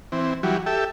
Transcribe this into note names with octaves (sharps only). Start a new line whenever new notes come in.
E3 C4
E3 F#3 G3
G4 A4 E5